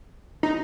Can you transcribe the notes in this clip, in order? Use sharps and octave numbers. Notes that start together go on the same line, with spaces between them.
D#4